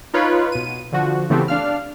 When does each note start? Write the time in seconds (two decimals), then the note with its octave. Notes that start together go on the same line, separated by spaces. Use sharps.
0.14 D#4 F4 B4 C#5
0.52 B2 D#7
0.92 D3 F3 F#4
1.30 C#3 E3 A3 B3 C4 G4
1.48 D4 F5 F6